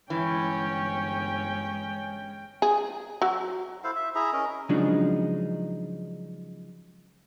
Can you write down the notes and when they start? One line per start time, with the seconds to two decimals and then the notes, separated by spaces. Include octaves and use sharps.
0.10 G1 E3 G#3 C#4 G5
2.62 G#4
3.22 F#3
3.84 E4 A4 C5 F5
3.96 E5
4.15 E4 G#4 E5 A#5
4.33 C#4 G#4 A#4 D#5
4.69 C#3 F3 F#3 G#3 D4 D#4